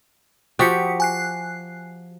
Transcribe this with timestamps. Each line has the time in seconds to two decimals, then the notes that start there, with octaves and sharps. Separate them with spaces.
0.59 F3 F#4 G4 D#6 B6 C#7
1.00 G#5 F#6 C7